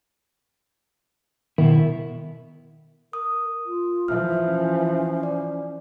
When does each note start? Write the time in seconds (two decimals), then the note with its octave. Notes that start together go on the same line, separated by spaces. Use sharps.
1.58 B2 D#3 E4
3.13 A#4 D#6
3.66 F4
4.08 E3 F3 E5 F6
4.45 C#4
5.23 D5